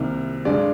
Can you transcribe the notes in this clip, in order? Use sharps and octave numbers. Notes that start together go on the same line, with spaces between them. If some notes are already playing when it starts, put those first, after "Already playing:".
Already playing: C2 C3 D#3 A#3
G2 D3 G#3 D5